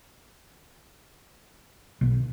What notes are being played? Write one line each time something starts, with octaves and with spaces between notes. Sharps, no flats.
B1